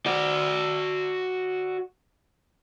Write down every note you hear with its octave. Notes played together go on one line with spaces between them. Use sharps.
F#4 D5